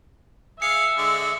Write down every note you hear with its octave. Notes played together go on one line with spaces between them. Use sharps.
G#4 E5 F5 C#7
D3 G#3 D5